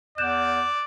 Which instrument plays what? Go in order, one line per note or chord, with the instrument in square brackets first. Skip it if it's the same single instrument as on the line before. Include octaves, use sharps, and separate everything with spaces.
[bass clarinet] E2 [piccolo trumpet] D5 [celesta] F#6 G6 E7